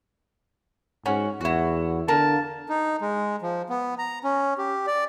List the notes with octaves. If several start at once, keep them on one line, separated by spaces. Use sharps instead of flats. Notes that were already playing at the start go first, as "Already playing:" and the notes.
G#2 C#4 F#4
E2 E4 F#4
D3 A#3 A5
D#4
G#3
F3
B3
A#5
C#4
G4
D5